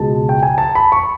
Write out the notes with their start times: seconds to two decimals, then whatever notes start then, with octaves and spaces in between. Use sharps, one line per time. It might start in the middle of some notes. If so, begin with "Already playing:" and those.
Already playing: C#2 B2 G#3 A5
0.29 G5
0.43 G#5
0.58 A5
0.75 B5
0.92 C#6